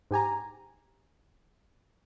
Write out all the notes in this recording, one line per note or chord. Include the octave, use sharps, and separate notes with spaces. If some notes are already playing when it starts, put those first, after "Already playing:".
G#2 G4 G#5 A#5